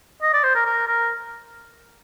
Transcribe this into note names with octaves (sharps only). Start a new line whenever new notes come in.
D#5
D5
C5
A#4
A#4
A#4